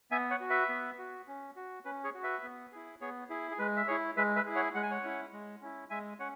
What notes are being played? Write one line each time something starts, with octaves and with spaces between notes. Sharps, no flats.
B3 E5 G#5
C#5 F#5
F#4
B4 E5
B3
F#4
C#4
F#4
C#4 B4
G#4 C#5
F#4
B4 E5
B3
E4 G#4
B3 G#4 C#5
E4 G#4
G#4
G#3 B4
E5
E4 G#4 C#5
G#3 B4 E5
B4 E5
E4 G#4
C#5 F#5
G#3 F#5
G#5
C#5 F#5
C#4 E4
G#3
C#4 E4
G#3 E5 G#5
C#4 C#5 F#5